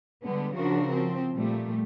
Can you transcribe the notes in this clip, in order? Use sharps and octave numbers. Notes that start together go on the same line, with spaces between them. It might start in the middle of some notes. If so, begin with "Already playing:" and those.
D3 G3 G#3 B3
C#3 F3 D4 F#4 A#4
F3 C4
A#2 G3 A3